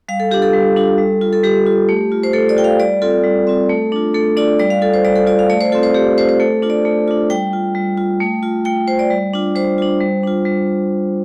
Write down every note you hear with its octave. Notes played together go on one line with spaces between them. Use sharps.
G3 F5
A4
D4 F4 G4
A4
G3
D4 F4
G3
F4
A4
G3 G4
F4
A3
F4
C5
A3 A4
D5
F4 G5
F5
G3 D5
C4 F4 A4
G3
C4 F4
A3
D4 F4
A3 A4
D4 F4 D5
G3 D5
F5
F4 A4
C5
G3 D5
A4
F4 D5
F5
A3 D5
C5
C4 F4 A4
C5
A3 G4
C4 F4 C5
C5
A3 A4
D4 F4
D5
A3
D4 F4
G3 G5
F4
G3
F4
A3
F4
A3 G5
F4 C5
D5
G3
D4 F4
G3 C5
D4 F4
G3
D4 F4
G3